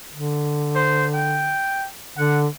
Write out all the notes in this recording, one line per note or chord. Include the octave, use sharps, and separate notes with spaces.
D3
C5
G5
D3 F#5